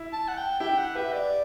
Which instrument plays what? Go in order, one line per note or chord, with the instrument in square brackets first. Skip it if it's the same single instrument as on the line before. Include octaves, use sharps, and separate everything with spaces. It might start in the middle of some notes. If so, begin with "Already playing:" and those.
Already playing: [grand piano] E4
[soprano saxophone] A5
F#5
G5
[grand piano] E4 G4 [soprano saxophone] G5
[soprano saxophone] F#5
[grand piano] G4 B4 [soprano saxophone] E5
[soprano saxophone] D5